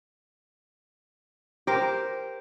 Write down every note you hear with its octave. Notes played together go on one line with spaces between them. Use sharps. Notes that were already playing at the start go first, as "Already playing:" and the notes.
G4 A#4 C5